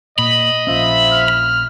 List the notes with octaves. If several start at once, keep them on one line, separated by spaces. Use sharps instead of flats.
A#2 D#5 B5
A#1 F3 C#4 E5
F6